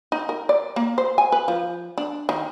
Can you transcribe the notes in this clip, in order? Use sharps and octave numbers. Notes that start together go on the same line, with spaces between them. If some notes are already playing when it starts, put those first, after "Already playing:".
D#4
A#4
D5
A#3
C5
G#5
B4
F3
D4
D#3